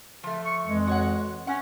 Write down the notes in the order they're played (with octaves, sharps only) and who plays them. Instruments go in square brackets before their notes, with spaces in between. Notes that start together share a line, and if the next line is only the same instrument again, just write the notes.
[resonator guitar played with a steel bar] F3 A3
[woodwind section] C#6
F2 E3 G#3
[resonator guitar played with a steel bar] F#4 C#5 F#5
[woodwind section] C#4 [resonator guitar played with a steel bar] F#5